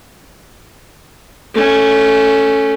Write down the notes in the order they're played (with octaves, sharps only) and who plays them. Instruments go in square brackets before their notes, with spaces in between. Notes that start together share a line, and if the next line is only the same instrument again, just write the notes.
[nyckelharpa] A3 C#4